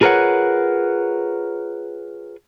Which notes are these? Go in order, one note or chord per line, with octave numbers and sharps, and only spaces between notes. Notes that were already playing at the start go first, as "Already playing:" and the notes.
F4 G#4 A#4 B4 C#5 F#5